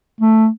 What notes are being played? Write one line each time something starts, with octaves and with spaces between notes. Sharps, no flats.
A3